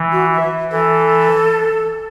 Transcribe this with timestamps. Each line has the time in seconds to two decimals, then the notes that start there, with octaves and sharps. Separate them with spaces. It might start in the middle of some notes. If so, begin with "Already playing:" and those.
Already playing: E3
0.12 F#4
0.33 E5
0.72 E3 A4